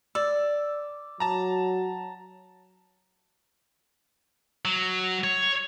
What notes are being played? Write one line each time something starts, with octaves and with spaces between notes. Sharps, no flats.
D5 E6
F#3 A5 A#5
F#3
C#5